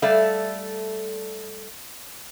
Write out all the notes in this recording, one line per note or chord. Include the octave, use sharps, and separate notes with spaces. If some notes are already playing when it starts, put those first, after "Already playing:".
G3 A3 A4 D5 E5 F5